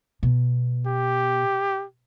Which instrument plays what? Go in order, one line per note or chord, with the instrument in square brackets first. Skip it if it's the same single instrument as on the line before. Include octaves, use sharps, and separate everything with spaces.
[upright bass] B2
[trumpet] G4